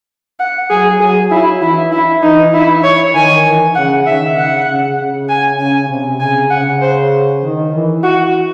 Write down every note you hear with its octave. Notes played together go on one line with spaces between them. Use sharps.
F#5
F#3 G#4
F#3 G#4
F#3 E4
E3 E4
E4
E3 D#4
E4
C#5
D#3 G#5
E3
C#3 F#5
D#3 E5
C#3 F#5
C#3
C#3
G#5
C#3 G#5
C3
C#3 G#5
C#3 F#5
C5
D#3
E3
F#4